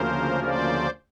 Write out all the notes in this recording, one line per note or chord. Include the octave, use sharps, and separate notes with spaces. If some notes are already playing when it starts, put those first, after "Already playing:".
Already playing: D2 C#3 F3 A#3 A#4 C5
C5 D5